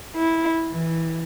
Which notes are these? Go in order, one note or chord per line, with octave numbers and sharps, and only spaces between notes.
E4
E3